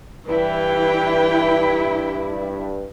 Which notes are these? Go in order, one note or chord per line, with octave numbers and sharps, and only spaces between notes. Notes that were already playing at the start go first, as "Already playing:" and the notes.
G2 E3 E4 G5